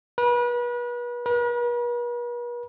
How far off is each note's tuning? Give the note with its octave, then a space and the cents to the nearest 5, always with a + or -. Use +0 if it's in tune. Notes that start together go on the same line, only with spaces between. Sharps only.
B4 -35
B4 -45